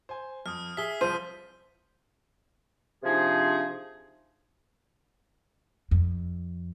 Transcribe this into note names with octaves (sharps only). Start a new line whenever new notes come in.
C5 G#5
F2 D#6 F6
G#4 E5 B6 G7
C2 F3 C5 D#7
C3 F3 D4 D#4 G#4
F2